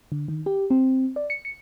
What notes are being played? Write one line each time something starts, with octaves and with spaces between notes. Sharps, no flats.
D3
D#3
G4
C4
D5
C#7
C#7